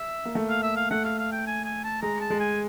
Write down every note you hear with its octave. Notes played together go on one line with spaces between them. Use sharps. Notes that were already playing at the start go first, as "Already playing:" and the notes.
Already playing: E5
A#3
A3
F5
E5
F5
A3 F#5
F5
F5
G5
G#5
G#5
A5
G#3 A#5
A5
G#3
G#5